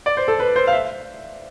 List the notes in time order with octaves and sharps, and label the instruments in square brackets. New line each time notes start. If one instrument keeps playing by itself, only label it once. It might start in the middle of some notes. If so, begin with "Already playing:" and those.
[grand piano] D5
C5
A4
B4
C5
F5
E5